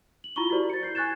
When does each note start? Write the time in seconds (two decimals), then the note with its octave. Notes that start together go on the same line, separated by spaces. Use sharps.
0.24 F#7
0.36 E4 F4 A#5 B5 C#6 G7
0.50 E4 F#4 G4 A#4 C5 D5
0.70 A6 C#7
0.83 G6 C7
0.95 G#5 C#6 F#6 G#6 A6 E7